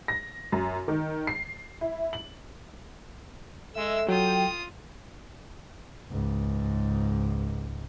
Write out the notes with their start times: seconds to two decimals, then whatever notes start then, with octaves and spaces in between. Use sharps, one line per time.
0.08 A#6
0.52 F#2
0.88 D#3
1.27 C7
1.81 E4
2.13 F#7
3.75 G#3 A4 E5 E6
4.08 F#3 F4 G5 D#6
6.10 C#2 G#2